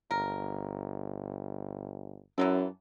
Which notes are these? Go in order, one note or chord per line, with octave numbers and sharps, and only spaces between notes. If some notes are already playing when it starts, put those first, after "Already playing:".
G1 A#4
F#2 E3 F#3 A4